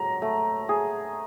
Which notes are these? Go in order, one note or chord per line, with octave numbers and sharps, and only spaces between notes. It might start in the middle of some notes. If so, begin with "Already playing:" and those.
Already playing: F#3 A#5
A3
G#4